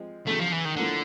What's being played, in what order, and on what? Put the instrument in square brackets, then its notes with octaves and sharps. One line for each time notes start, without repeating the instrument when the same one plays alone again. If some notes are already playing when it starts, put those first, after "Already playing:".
Already playing: [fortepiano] F3 G#3 C4
[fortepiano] E2 C#3 F#3 [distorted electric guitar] A3
[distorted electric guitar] F3
E3
D#3
[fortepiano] A2 F3 A#3 [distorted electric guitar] D3